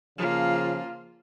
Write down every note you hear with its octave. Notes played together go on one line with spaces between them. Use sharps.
C#3 F3 A#3 F4